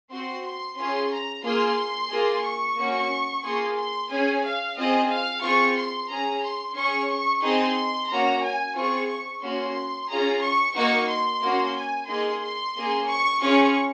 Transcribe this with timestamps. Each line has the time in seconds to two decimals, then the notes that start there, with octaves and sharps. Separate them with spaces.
0.10 C4 F#4 C6
0.44 C6
0.77 C#4 F4 G#4 C6
1.11 A#5
1.43 A#3 F4 G#4 C6
2.10 A#3 F4 G#4
2.44 C#6
2.77 A#3 C#4 F#4
3.43 A#3 F4 G#4 C6
3.77 C6
4.09 C#4 G#4 G#5
4.43 F5
4.76 C4 F4 G#4 D#5
5.10 F5
5.43 C4 F4 G#4 C#6
5.76 C6
6.09 C#4 G#4 A#5
6.43 C6
6.75 C#4 G#4 C#6
7.10 C#6
7.42 C4 D#4 G#4 C6
8.09 A#3 C#4 F#4 A#5
8.42 G#5
8.75 C4 F4 G#4 C#6
9.09 C#6
9.42 A#3 C#4 F#4 C6
10.09 C#4 F4 G#4 A#5
10.41 C#6
10.75 A#3 D#4 F#4 C#6
11.09 C6
11.42 A#3 C#4 F#4
11.75 G#5
12.08 A#3 D#4 G#4 C6
12.41 C6
12.75 A#3 C#4 G#4
13.08 C#6
13.41 C#4 F4 G#4 C#6